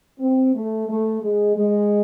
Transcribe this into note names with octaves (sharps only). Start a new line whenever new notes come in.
C4
A3
A3
G#3
G#3